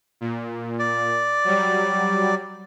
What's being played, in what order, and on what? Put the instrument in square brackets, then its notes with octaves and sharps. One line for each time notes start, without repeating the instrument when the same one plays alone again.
[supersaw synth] A#2
[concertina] D5
[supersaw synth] F#3 G3